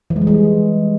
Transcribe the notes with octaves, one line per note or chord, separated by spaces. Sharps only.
E3
G#3
G3
G#3